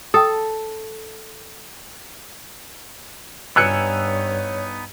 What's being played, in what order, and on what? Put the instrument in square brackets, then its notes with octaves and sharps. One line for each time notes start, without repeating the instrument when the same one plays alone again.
[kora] A4 [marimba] G5 D#6
[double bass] G2 [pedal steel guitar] B3 D#4 G#5 [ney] C#5 [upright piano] E6 F#6 C#7